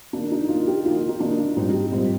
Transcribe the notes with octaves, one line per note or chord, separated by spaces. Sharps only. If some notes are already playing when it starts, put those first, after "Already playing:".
D#3 A#3 D4 D#4
D#4
D#3 A#3 D#4 F4
G4
D#3 A#3 D#4 F4
F4
D#4
D#3 A#3 D4 D#4
G#2 G3 C4 D#4 F4
G4
G#2 G3 C4 F4